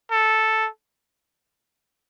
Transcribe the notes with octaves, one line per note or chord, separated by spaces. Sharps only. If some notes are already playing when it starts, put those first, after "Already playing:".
A4